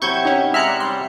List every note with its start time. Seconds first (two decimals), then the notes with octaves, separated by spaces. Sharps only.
0.02 C3 F#3 E4 C#6 G6 G#6
0.25 C#4 D#4
0.54 G#3 E5 A#5 F6 F#6 C#7
0.67 D5
0.80 G3 C6